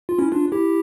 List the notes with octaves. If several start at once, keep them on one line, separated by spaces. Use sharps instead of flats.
F4
C#4 E4
D4 F4
E4 G4